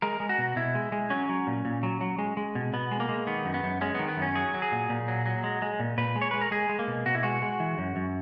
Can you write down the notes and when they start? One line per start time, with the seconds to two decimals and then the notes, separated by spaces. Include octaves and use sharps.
0.02 G#3 A#4
0.20 G#3
0.29 F#4
0.38 B2
0.56 B2 E4
0.75 G#3
0.92 G#3
1.10 F#3 C#4
1.29 F#3
1.47 A#2
1.65 A#2
1.83 F#3
2.01 F#3
2.18 G#3
2.37 G#3
2.55 B2
2.73 B2 B3
2.91 G#3
3.00 A#3
3.09 G#3
3.27 D#3 B3
3.45 F#2
3.54 B3
3.63 F#2
3.81 G#3 C#4
3.95 D#3 B3
4.08 B3
4.17 F#2 C#4
4.35 F#3 G#4
4.54 F#3
4.62 G#4
4.72 A#2
4.90 A#2
5.08 F#3
5.26 F#3
5.44 G#3
5.62 G#3
5.80 A#2
5.98 A#2 B4
6.16 G#3
6.22 C#5
6.31 G#3 B4
6.41 A#4
6.51 G#3 G#4
6.69 G#3
6.79 A#3
6.87 B2
7.06 B2 F#4
7.15 E4
7.23 G#3 F#4
7.42 G#3
7.60 E3
7.78 F#2
7.96 F#2